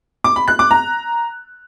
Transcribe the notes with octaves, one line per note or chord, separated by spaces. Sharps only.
D6
B5
F#6
D6
A#5